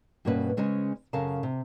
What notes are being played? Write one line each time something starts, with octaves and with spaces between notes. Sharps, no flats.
G2 B2 A#3 C#4 F#4 B4
C#3 G#3 C#4 C5 G#5
F#2 C#3 A4 A#4 F5 A5
C3